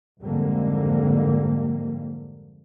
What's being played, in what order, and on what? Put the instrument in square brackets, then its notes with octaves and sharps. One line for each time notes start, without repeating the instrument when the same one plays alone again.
[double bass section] G#1 F2 G#2 D3 G3 A#3